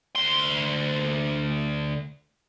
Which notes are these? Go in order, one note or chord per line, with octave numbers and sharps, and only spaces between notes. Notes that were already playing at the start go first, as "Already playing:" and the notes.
D2 C6